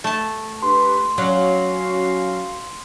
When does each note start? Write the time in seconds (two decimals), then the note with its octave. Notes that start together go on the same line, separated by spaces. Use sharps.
0.04 A3 A5
0.62 D4 G4 B4 C6
1.18 F#3 C#4 F#4 F5